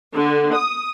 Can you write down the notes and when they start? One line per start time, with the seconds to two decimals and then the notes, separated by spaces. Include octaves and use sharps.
0.15 D3
0.56 D#6